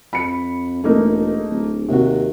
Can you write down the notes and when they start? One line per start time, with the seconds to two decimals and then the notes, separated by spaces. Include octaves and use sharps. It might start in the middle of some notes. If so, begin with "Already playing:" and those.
0.13 F2 B5 C#7
0.84 E1 A3 A#3 D#4
1.50 D1
1.88 D#2 C3 F#4